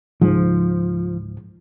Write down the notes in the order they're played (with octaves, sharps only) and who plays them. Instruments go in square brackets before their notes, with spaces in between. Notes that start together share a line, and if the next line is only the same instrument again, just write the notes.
[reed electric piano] C#2 G#2 [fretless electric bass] F3